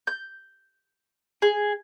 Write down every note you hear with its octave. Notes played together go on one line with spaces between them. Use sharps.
G6
G#4